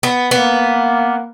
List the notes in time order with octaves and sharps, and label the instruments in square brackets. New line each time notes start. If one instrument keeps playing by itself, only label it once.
[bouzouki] B3
[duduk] A#3 [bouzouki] B3